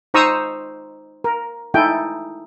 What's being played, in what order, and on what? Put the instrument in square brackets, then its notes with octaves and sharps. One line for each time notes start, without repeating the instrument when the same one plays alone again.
[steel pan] D#4 C5 A#5 C#6 D#6 E6
A#4
D#4 E4 A4 G5 G#5